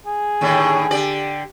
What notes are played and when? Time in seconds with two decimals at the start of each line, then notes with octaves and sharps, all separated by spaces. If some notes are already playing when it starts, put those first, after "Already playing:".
0.06 G#4
0.41 D#2 A2 D3
0.91 D3 G4 D5